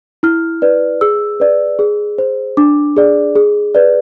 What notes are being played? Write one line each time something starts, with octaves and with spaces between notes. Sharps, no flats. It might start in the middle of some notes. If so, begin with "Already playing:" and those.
E4 F6
B4 D5
G#4 E6
B4 D5
G#4
C5
D4 D6
G#4 D5
G#4
B4 D5